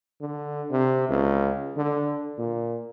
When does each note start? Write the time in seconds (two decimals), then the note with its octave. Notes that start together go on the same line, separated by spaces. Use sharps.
0.21 D3
0.71 C3
1.09 C#2
1.77 D3
2.38 A#2